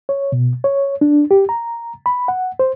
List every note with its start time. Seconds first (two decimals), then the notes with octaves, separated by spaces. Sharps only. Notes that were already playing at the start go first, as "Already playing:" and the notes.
0.09 C#5
0.32 B2
0.64 C#5
1.01 D4
1.31 G4
1.49 A#5
2.06 B5
2.28 F#5
2.59 C5